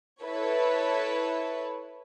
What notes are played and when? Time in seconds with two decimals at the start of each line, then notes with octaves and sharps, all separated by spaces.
0.22 E4 A4 B4 C#5